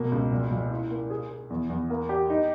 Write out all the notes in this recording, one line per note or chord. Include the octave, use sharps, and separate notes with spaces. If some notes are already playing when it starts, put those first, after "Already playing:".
Already playing: B2 A#3
C#2
A#2
A#2
E4
A#3
G#4
G#4
E2
E2
A#3
G4
D#4